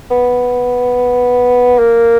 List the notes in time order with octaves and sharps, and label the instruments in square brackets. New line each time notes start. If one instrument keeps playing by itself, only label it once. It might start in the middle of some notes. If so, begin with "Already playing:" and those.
[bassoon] B3
A#3